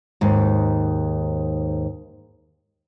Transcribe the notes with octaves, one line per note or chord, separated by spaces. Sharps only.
D#2 G#2